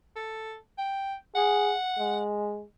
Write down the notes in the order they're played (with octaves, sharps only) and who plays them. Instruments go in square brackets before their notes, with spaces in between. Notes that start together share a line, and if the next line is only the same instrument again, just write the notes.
[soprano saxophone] A4
G5
[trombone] G#4 [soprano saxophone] F#5
[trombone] G#3